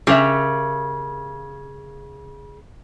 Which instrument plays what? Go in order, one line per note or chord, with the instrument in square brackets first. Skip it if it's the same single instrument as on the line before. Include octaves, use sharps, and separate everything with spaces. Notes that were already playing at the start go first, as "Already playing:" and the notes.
[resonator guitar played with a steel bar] C#3 [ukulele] G4 A#4 E5